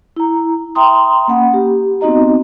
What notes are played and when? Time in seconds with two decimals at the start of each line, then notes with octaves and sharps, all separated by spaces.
0.16 E4 A#5
0.75 E5 G5 A#5 C6 D#6
1.28 A#3 C#4 F#5 B5
1.54 G4
2.01 B3 C4 D#4 F#4 D#5 A#5